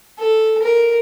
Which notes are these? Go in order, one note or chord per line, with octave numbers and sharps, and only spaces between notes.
A4
A#4